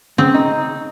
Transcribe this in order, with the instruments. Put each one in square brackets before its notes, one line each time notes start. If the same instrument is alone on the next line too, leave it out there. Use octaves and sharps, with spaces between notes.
[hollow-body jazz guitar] C#3 [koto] C4
[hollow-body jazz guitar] D#4